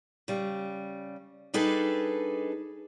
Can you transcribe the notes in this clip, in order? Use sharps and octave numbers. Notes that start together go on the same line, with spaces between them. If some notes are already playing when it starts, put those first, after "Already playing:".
C#3 G3
G3 D4 D#4 G#4 A4 B4